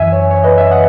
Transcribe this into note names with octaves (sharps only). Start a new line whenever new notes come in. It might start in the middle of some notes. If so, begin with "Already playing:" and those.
Already playing: F#2 E3 E5 G#5
C#5
C#5
B4 D#5
C#5 E5
D#5 F#5